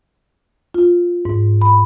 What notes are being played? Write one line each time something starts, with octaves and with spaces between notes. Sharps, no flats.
F4
G#2
B5